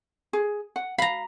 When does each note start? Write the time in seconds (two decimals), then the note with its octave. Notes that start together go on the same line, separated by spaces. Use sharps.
0.33 G#4
0.76 F#5
0.98 F5 A#5 B5